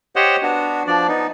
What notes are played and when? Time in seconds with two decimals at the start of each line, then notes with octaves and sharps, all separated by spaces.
0.16 G4 C5 C#5 D#5 F#5
0.43 B3 D4 F#4
0.87 F3 D4 D5
1.08 B3 D#4